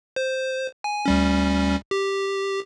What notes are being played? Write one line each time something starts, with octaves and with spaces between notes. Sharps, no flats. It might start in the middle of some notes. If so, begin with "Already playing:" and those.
C5
G#5
D2 G3 C#4
G4